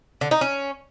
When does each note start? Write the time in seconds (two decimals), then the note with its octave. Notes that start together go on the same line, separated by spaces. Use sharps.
0.21 D3
0.31 D#4
0.41 C#4